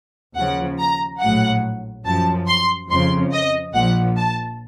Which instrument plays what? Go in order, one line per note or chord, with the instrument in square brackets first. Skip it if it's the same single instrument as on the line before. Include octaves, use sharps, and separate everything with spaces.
[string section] D#2 C#3 F3 F#5
A#5
A#1 A2 F#3 F#5
F#2 F3 A5
C6
F2 C#3 F3 C6
D#5
A#1 A#2 F3 F#5
A5